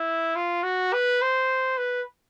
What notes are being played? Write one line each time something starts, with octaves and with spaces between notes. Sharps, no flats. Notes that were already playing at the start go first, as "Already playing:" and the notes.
Already playing: E4
F4
F#4
B4
C5
B4